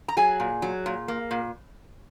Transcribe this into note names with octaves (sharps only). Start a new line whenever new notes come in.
A#5
F#3 G#4 G#5
A#2
F#3
A#2
A#3
A#2